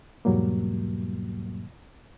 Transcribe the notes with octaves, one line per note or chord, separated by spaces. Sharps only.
E2 G#2 B2 F#3 G3 A#3